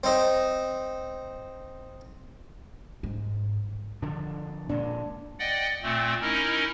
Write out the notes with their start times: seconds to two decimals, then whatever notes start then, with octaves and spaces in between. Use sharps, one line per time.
0.04 C4 D#4 C5
3.03 G#2
4.02 D3 F3 D4
4.69 A#2 G#3 D4
5.39 D5 D#5 F#5 G5
5.83 A#2 A3 C4
6.21 C#4 D#4 E4 A#4 D#5